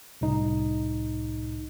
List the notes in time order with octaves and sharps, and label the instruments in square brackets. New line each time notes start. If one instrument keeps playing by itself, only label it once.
[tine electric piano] C2 A2 D#4